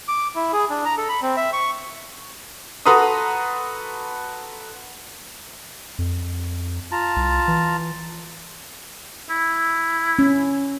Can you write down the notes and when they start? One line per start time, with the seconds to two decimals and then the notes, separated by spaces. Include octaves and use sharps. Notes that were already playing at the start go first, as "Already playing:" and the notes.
0.08 D6
0.36 E4
0.53 G#4
0.70 D4
0.85 A#5
0.97 A4
1.09 B5
1.22 C4
1.37 E5
1.53 C#6
2.86 F#4 A4 B4 A#5 C6 D#6
5.99 F2
6.91 F4 A5 A#5
7.16 C2
7.48 E3
9.30 E4
10.19 C#4